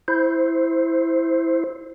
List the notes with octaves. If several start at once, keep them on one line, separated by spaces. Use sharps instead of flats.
E4 C5